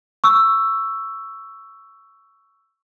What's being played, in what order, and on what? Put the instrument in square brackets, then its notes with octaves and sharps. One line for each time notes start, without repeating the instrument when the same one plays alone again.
[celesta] C#6 E6